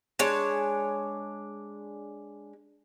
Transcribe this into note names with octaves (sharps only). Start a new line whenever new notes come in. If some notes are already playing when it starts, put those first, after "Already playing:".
G#3 D4 C#5